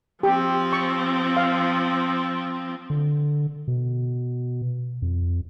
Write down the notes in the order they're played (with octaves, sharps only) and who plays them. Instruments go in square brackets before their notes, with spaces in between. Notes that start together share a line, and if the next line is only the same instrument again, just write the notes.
[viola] F3 C4 [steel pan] G4
[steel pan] C#6
F5
[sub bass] D3
B2
F2